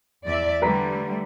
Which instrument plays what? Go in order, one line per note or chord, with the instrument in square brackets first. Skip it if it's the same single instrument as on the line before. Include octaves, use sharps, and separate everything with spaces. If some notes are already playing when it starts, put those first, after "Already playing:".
[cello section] E2 D5 E5
[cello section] D3 G3 A3 [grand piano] B4 A#5 B6